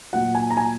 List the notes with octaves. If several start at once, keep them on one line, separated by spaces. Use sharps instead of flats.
A#2 F#3 F#5
G#5
A#5
G#5